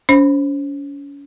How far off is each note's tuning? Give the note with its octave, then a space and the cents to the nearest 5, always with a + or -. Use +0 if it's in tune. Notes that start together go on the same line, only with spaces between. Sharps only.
C#4 +40 C5 +15 B5 +0